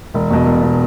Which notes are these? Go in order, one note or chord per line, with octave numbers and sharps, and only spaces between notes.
E1
E2 B2
E1
B2